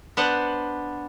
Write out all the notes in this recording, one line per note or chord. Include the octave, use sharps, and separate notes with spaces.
B3 D4 C5 F#5